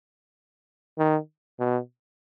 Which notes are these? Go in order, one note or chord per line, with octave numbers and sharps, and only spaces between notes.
D#3
B2